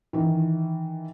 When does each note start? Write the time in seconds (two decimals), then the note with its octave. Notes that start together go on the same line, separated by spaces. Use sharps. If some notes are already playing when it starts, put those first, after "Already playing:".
0.13 D#3 E3